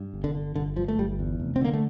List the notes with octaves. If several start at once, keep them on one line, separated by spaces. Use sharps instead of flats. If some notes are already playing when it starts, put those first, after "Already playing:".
Already playing: G2
G1
D3
D3
G1 D3
G2 F3
A3
G1 G3
E2
F1
C4
D3 A#3
A3